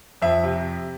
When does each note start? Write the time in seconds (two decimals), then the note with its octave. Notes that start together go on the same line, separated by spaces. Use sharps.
0.22 F2 E5
0.44 C3